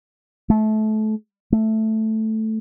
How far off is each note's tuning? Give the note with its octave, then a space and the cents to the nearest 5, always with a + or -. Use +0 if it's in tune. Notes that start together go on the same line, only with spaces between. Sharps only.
A3 -25
A3 +0